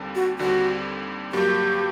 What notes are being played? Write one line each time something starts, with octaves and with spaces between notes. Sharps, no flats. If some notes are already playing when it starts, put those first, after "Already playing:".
Already playing: D#2 D3 G3 C4
F#4
D#2 D3 G3 C4 F#4
G2 F#3 A#3 G4